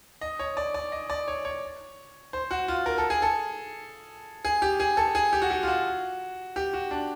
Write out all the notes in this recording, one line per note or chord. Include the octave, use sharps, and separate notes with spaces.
D#5
C#5
D5
D5
D#5
D5
C#5
C#5
C5
F#4
F4
A#4
A4
G#4
A4
G#4
G4
G#4
A4
G#4
G4
F#4
G4
F4
F#4
G4
F#4
D4